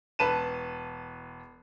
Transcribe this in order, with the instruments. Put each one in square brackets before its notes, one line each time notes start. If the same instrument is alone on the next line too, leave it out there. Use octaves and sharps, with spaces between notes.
[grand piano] E1 B4 A5 D#7 E7